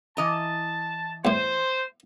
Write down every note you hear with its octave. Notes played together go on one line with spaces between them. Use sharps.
E3 D#5 A5 A#5
E2 A2 C5